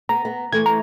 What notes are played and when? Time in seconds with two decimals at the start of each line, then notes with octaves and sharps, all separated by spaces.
0.09 B3 A#5
0.25 B3
0.53 E3 A3 G#6
0.66 A#5